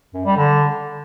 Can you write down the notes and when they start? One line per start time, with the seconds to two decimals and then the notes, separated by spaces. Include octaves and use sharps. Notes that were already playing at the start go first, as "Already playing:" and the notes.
0.14 F#2
0.25 G3
0.37 D3